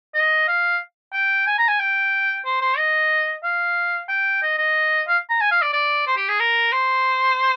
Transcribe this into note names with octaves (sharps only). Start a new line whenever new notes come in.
D#5
F5
G5
G#5
A#5
G#5
G5
C5
C5
D#5
F5
G5
D#5
D#5
F5
A#5
G#5
F5
D5
D5
C5
G4
G#4
A#4
C5